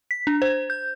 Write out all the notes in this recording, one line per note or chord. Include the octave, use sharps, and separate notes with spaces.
B6
D4
C5
G6